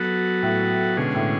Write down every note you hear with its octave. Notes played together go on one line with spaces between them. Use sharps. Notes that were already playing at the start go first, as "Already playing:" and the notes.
Already playing: F#3 B3 F#4 A4
A2
B2 D3 G#3 C#4 G#4
A2